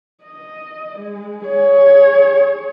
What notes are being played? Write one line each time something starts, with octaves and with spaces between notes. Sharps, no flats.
D#5
G#3
G#4 C#5